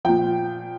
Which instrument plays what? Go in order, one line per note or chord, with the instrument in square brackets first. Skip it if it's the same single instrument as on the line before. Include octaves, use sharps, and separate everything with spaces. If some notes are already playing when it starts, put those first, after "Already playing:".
[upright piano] A#2 F3 G5